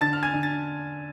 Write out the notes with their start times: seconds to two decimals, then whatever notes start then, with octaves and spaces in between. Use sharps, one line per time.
0.01 D3 A5 A6
0.13 F6
0.23 G#5 G#6
0.33 D3
0.43 A6